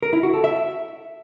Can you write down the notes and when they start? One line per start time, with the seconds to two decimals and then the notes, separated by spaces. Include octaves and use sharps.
0.03 A#4
0.13 E4
0.23 F#4
0.34 A4
0.44 E5